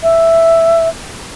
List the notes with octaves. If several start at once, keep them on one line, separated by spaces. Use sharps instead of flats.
E5